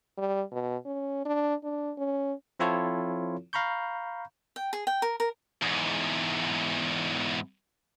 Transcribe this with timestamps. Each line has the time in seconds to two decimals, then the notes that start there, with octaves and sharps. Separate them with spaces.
0.18 G3
0.51 B2
0.85 C#4
1.25 D4
1.63 D4
1.98 C#4
2.59 F3 C4 E4 F4 A4 C#5
3.53 F5 A#5 B5 C#6 G6
4.56 G5
4.73 G#4
4.87 G5
5.02 A#4
5.20 A#4
5.62 E2 G#2